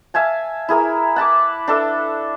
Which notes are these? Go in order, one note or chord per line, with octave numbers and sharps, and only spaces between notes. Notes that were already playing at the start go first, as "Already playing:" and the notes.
E5 F5 G#5 A5
E4 G#4 A#4
F#5 A5 B5 D6
D4 A4 E5